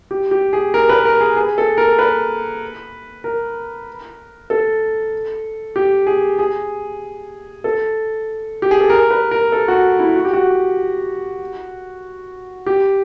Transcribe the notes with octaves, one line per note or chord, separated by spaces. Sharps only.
G4
G4
G#4
A#4
B4
A#4
G#4
G#4
A4
A#4
B4
A#4
A4
G4
G#4
G#4
A4
G4
G#4
A4
A#4
B4
A#4
A4
F#4
E4
F#4
G4
F#4
G4